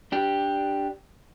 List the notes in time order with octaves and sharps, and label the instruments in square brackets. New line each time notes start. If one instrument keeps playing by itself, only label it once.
[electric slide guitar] D4 G4